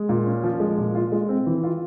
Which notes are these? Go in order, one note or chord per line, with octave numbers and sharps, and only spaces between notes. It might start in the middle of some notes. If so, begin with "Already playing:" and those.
Already playing: G#3
A#2
C#4
F3
G#3
A#2
F4
G#3
C4
E3
F4